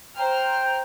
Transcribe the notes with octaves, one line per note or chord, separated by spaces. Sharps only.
C5 G5 A#5 F6